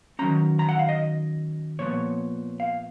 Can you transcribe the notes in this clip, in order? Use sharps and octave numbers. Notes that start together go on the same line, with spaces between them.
D#3 F#3 C#4 A#5
A#5
F#5
F5
D#5
A#2 F3 B3 C#5
F5